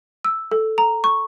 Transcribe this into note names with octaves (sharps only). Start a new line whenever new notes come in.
E6
A4
A#5
C#6